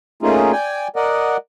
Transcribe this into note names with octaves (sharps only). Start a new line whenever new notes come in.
A3 A#3 C#4 D#4 F4 G#4
D5 G5 G#5
A#4 D5 D#5 F#5